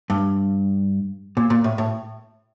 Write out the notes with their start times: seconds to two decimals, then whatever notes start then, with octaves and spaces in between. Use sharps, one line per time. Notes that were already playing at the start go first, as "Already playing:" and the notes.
0.10 G2
1.37 A#2
1.50 A#2
1.64 A2
1.78 A2